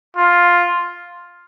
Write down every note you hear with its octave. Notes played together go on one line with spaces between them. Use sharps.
F4